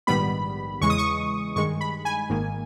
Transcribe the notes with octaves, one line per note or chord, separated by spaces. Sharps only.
A#1 G#2 D#3 G3 B3 B5
E2 C#3 E3 G#3 C#6
D#6
C#6
G2 D#3 G#3 C#6
B5
G#5
G#1 G#2 D#3 A#3